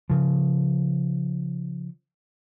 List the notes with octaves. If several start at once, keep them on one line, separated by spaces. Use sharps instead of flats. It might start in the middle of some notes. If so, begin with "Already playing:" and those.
C#3 F3